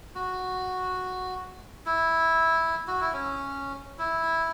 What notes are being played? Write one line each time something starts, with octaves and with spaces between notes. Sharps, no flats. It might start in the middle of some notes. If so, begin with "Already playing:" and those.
F#4
E4
F#4
E4
C#4
E4